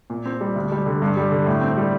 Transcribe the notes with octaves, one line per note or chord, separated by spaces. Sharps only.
A#2
C4
G3
D2
G3
D3
G2
G3
D3
A2
C4
G3